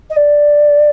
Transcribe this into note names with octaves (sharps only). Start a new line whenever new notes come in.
D#5
D5